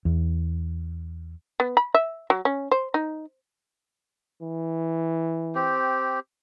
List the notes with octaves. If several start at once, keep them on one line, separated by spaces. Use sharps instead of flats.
E2
B3
B5
E5
F#3
C#4
C5
D#4
E3
C4 G4